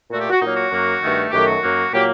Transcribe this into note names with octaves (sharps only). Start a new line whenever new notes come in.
A#2 A3 F#4
G4
F#4
A#2 F#3 A#3 D#4
F#4
F#2 F#3 A#3
G2 D#3 A3
F#2 D#3 F#3 A3 G4
F#4
F#2 F#3 A#3
A#2 F#3 A#3 G4